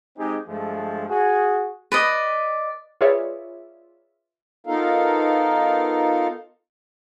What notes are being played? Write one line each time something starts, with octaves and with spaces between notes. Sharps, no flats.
G#3 C4 D#4 G4 G#4
G2 F3 G#3 A3
F#4 G#4
B4 D5 D#5
F4 G#4 B4 C#5 D5 E5
B3 D#4 F4 A4 A#4 F5